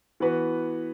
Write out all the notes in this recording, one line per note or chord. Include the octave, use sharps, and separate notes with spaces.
E3 B3 F#4 B4